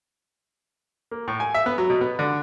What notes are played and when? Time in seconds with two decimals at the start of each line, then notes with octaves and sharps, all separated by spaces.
1.11 A#3
1.28 A2
1.40 G#5
1.54 E5
1.66 B3
1.78 F#3
1.90 B2
2.01 B3
2.19 D3